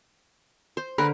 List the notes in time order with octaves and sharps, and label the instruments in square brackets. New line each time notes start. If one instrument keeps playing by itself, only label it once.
[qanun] C5
[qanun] D3 [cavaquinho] A#4 B4 B5